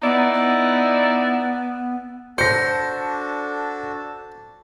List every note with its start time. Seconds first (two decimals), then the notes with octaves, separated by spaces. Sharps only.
0.03 B3 D#4 E4 D5
0.34 B3
2.38 D4 F#4 A4 C5 A#6 C#7